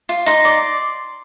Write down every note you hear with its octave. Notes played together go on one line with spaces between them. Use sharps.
F4
D#4 C6
D5